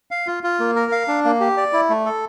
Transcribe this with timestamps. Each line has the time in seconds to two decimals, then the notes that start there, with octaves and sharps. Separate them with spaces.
0.11 F5
0.27 F4
0.43 F4
0.60 A#3
0.76 A#4
0.92 F5
1.08 D4
1.25 A#3
1.40 G4
1.57 D5
1.73 E4
1.90 A3
2.05 A4